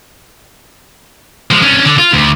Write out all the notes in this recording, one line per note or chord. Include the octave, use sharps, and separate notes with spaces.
F3 G#3
C#4 D4
D3
F4
D2